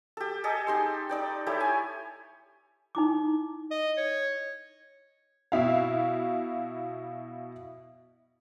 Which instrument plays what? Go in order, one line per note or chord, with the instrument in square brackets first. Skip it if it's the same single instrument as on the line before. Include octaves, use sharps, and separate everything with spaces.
[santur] G4 A4
G#4 A4 D#5
D#4 G4 C6
D#4 D5 G5
E4 G4 A4 C#5
G#5
[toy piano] D#4 E4 D6
[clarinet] D#5
C#5
[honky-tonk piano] B2 E4 F5